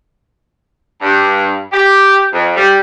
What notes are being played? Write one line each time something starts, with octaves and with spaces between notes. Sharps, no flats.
G2
G4
F2
G3